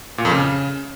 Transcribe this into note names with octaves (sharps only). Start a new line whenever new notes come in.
A#2
F2
C#3